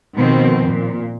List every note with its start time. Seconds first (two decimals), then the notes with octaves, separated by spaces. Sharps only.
0.16 B2 D#3 F3 B3 C4
0.67 A#2